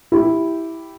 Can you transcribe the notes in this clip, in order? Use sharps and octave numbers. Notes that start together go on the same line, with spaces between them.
E4 G4